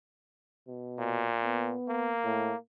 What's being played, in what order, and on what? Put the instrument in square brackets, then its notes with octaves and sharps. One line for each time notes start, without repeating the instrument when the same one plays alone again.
[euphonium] B2
[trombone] A#2
[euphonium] B3
[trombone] A#3
[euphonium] A2